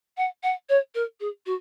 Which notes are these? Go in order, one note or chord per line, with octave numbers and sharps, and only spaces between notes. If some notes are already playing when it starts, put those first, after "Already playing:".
F#5
F#5
C#5
A#4
G#4
F#4